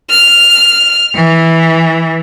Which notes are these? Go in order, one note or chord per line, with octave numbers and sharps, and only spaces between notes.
F6
E3